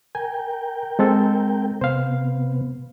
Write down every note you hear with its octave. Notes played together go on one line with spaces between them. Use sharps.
A#4 G5 G#5
G#3 C4 A4
C3 B3 C5 F5